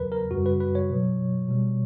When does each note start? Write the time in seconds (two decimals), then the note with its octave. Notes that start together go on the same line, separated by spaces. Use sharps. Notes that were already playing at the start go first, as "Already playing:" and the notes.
Already playing: E2 C#3 F#3 A#4 B4
0.12 A#4
0.31 F#2 C#3 G3 F#4
0.46 B4
0.60 B4
0.75 C#5
0.90 B2 F#3
1.48 B2 G3